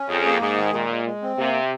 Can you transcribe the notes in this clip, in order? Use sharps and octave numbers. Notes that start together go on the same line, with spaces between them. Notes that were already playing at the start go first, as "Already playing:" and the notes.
Already playing: C#4
F2 G#4
A#3
G#2 G#4
D#3
A#2 G#3
G#3
G#3
C4
C3 A#3